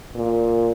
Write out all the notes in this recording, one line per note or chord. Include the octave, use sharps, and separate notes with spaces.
A#2